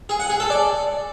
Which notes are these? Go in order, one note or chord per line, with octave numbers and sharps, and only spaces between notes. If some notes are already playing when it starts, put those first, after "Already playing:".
G#4
F#5
G#4
A4
D5